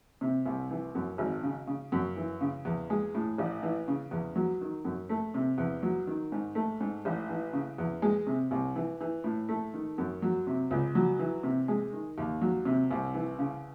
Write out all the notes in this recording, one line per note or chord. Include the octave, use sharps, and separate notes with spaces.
C3
C2
E3
F#2
G#1
C#3
C#3
F#2
E3
C#3
E2
G#3
A2
A1
E3
C#3
E2
F#3
D#3
F#2
A3
C3
E2
F#3
D#3
G#2
A3
G#2
A1
E3
C#3
E2
G#3
C3
C2
E3
E3
A2
A3
D#3
F#2
F#3
C3
C#2
F#3
E3
C3
G#3
D#3
D#2
F#3
C3
C2
E3
C#3